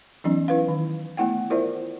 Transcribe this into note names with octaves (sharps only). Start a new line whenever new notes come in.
E3 F#3 B3 C#4 D#4
E4 B4 F5
D#3
A3 B3 E4 F#5 G5
E4 F4 A#4 C5 D5 E5